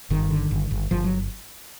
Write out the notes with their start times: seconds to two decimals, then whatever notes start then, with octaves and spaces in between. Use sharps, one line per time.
0.10 G1 D#3
0.31 D3
0.51 G1
0.71 G1
0.91 G1 F3
1.04 F#3